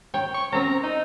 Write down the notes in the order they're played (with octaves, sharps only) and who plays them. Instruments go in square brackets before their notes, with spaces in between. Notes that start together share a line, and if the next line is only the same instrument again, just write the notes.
[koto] C#5 [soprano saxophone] G5
[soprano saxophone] C#6
[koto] C4 C#4 [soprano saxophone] A#5
[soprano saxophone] D#4